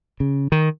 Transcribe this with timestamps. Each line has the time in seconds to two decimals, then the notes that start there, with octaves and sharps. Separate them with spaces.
0.20 C#3
0.52 D#3